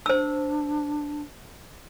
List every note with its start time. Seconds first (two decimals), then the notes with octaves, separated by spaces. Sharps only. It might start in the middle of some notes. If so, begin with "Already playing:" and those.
0.06 D4 C5 E6